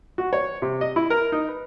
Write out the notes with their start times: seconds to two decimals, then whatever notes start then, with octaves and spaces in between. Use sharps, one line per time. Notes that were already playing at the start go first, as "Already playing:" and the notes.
0.18 F#4
0.33 C#5
0.62 C3
0.81 D#5
0.96 E4
1.10 A#4
1.32 D#4
1.48 B4